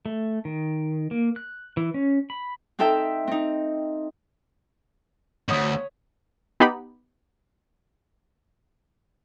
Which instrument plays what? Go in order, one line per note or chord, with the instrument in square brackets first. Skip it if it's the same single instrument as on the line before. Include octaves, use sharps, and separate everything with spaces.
[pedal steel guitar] A3
D#3
A#3
F#6
E3
C#4
B5
[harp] C4 D#4 A4 E5 G5
C4 D#4
[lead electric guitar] D2 G#2 [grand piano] C#5 D#6 B6
[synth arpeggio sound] B3 D#4 G4 B5